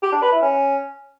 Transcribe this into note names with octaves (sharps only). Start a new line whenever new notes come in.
G4
D4
B4
E4
C#4